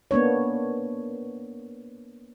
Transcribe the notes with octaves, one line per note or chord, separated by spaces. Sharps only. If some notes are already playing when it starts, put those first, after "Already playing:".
A#3 B3 D4 C#5